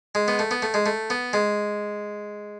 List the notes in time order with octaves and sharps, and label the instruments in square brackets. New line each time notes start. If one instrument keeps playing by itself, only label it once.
[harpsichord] G#3
B3
A3
B3
A3
G#3
A3
B3
G#3